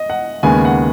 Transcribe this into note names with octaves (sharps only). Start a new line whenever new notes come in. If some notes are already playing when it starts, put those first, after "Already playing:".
Already playing: D#5
F#5
D#2 C#3 G#3 B3 G#5
F#5